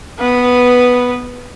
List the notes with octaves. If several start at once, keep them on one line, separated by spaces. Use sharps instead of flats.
B3 B4